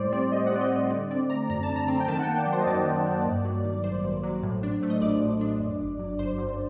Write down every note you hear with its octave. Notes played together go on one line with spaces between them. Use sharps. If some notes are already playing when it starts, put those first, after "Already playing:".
Already playing: A2 G3 C5 D5
C4 D5
A2 D#5
F#5
G3 D5
D#5
A2 D#5
D3 D5
C4 D5
A3 A#5
F#2 A#5
A5
D3
A#5
C4
G5
D#3 A5
F#5
A#3 G5
D5
F#3
C5
D#5
F#2 D5
D#3
A#3
G2
F#3
D#3
A1 C5
G2
F#3
A2
D4
A3
D#5
A#1 D5
A2
D4
F#2
G1
F#3
G1 C5
F#2